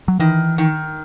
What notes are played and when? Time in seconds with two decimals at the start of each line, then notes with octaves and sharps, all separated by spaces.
0.08 F#3
0.19 D#3 E3
0.58 D#3